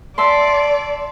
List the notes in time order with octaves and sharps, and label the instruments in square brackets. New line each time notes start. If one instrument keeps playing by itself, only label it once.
[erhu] D5 [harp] E5 A5 C6